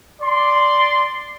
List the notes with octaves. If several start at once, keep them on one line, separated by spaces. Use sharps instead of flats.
D5 C6